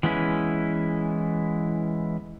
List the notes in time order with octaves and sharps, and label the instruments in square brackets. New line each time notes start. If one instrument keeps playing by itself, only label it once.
[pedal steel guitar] E3 G#3 B3 C#4 E4